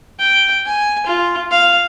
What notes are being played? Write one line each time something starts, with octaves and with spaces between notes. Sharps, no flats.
G5
G#5
F4
F5